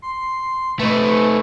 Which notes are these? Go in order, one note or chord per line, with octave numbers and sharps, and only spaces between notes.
C6
A3 D#4 B4